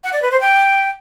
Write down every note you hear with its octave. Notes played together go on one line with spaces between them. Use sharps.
F#5
D5
B4
C5
G5